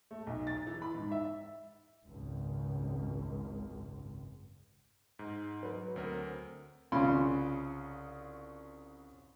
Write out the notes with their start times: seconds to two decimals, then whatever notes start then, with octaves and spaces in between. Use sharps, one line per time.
0.11 A3
0.27 B1
0.47 A6
0.67 E3
0.82 B5
0.95 G#2
1.12 E5
2.04 G#1 C#2 F#2
5.19 G#2
5.63 F#3 B4
5.96 D2 C4 A#4
6.92 C2 C#3 C#4 F4 B5 C6